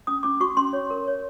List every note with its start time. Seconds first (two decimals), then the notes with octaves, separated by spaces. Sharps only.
0.07 C#4 D#6
0.23 C#4 D6
0.40 F#4 C#6
0.57 C#4 C6
0.73 C#5
0.90 A#4
1.07 C#5